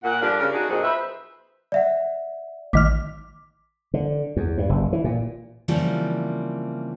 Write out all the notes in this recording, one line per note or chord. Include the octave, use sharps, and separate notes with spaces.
A#2 F#5
G2 F3 D4 G4 A#4 F5
C#3 A#4
D4 D#4 F#4 G#4
F2 A#2 C4 D#4 F#4 G#4
B4 C5 E5
D5 E5 F#5
A1 D#3 D6 F6 B6
D3
E2
G2
F#1
E3
A#2
C#3 E3 F3 G3 A#3 C4